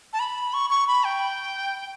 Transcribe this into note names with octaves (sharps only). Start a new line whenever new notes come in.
A5
B5
C#6
C#6
B5
G5